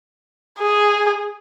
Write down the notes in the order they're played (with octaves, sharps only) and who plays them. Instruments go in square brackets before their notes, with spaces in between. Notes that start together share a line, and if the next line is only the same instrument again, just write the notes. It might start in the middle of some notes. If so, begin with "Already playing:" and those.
[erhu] G#4